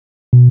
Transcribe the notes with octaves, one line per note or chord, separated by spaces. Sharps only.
B2